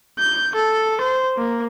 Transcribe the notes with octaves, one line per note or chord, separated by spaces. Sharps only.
G6
A4
C5
A#3